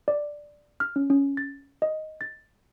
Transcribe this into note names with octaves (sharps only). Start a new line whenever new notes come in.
D5
F6
C#4
C#4
A6
D#5
A6